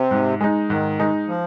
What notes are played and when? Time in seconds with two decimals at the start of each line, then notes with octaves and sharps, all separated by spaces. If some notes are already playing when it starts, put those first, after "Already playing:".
Already playing: C3
0.11 G#2
0.41 G#3 D#4
0.70 G#2 D#3
0.99 G#3 D#4
1.28 F3